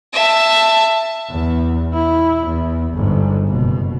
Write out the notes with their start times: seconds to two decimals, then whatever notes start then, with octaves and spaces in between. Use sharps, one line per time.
0.13 E5 A5
1.30 E2
1.94 E4
2.48 E2
2.94 G1 G#2
3.47 F#1 B2